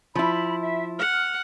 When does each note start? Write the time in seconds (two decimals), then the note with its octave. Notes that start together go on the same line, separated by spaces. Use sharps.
0.15 F3 E4 B5
0.61 E5
0.99 F#5 F6